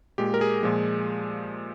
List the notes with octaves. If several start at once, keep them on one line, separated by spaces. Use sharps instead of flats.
A#2 G#3 G4
A#4
G#4
A#2 F3 G#3